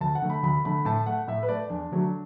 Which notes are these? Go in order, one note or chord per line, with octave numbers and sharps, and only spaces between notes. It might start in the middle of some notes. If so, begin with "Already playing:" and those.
D2 A5
F#5
D3 A3
B5
D2 B5
D3 A3 B5
A2 A5
A3 F#5
A2 E5
B4
A3 D5
E2 D4
D3 F#3 A3